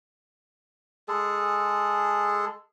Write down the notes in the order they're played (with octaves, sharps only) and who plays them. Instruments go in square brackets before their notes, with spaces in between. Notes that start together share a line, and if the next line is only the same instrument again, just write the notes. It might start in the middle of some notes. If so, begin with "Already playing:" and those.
[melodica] G#3 G#4 A4